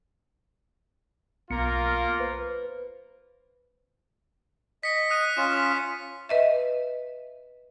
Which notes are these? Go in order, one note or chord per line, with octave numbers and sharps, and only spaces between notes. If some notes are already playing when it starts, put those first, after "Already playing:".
B1 A#3 B3 F4 A#4 C#7
B4 C5
D#5 B6 C#7
D#6 F#6 D#7
C#4 F4 E7
D#6 B6
B4 D#5 E5